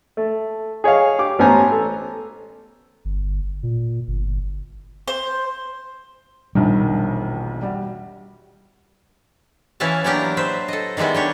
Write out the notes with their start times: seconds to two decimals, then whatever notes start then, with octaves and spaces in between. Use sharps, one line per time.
0.17 A3
0.84 G#4 C#5 D#5 F5
1.19 G4 D6
1.39 A1 B3 C#4 C5 G#5 A#5
1.72 A4
3.05 G1
3.63 A#2
4.08 G1
5.08 C5
6.55 E1 A#1 D#3 G3 D4
7.63 G3 F#4
9.80 E3 C#4 E4 B4 F5 A5
10.04 F#3 A#3 B3 D4 G4 A#4
10.37 B4 C5 E5
10.68 A4 D#5
10.97 D#3 G3 G#3 B3 E4
11.14 D4 G4 C#5